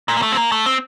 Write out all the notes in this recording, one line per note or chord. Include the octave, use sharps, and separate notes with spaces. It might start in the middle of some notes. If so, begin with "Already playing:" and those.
A#2
A#3
A3
C4
A#3
A3
C4